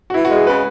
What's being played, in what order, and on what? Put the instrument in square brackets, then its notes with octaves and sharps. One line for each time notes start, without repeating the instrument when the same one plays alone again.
[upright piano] F#4
[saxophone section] E3 [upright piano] E4
[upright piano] F#4
[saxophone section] G#3
[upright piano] G#4
[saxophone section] C#3 [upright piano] B4